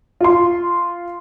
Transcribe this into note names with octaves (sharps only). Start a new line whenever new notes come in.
F4 C6